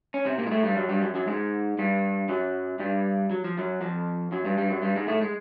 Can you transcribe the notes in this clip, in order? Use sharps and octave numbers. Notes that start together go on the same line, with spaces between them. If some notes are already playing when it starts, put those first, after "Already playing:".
C#4
C3 C4
A#2 A#3
G#3
A2 A3
G2 G3
F#2 F#3
G2 G3
F#2 F#3
F#2 F#3
G#2 G#3
G2 G3
F#2 F#3
G2 G3
F#3
F3
F#2 F#3
F2 F3
F#2 F#3
G2 G3
G2 G3
F#2 F#3
G2 G3
G#2 G#3
A2 A3
G#3